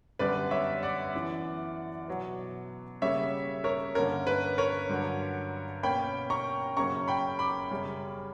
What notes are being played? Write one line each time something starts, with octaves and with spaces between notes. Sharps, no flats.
F#2 D3 G3 B3 B4 D5
C#5 E5
D5 F#5
F#2 E3 B3
B2 F#3 B3
C#3 G3 A#3 C#5 E5
A#4 C#5
G2 D3 A#3 C#4 A#4
B4
A#4 C#5
G2 D3 F#3
B2 A#3 C#4 G5 B5
A#5 C#6
F#2 C#3 F#3 A#3 C#4 A#5 C#6
G5 B5
B5 D6
F#2 C#3 G3 C#4